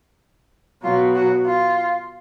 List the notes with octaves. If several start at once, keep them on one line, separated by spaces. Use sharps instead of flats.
B2 F#3 F4
F#4
F4